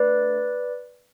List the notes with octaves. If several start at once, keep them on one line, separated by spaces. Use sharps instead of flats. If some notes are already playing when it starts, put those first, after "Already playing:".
Already playing: A3 D4 A4 B4 D5